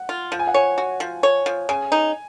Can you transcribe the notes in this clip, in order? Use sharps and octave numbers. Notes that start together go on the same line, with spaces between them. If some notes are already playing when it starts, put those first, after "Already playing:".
Already playing: F#5
F4
F3
G#5
F#5
C#5 G#5
F#4
F3
C#5
F3
C#3 G#5
D#4